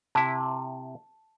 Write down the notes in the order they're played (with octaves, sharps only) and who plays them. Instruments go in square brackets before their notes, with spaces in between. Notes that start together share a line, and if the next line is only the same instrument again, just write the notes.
[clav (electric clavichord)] C3 E4 [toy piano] A5